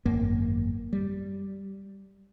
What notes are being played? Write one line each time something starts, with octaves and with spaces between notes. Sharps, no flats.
G#1 F#2 A#3
G3